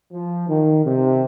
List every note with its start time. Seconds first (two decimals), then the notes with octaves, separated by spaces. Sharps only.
0.12 F3
0.48 D#3
0.84 C3